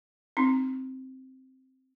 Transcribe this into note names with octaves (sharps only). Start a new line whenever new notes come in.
C4 D#4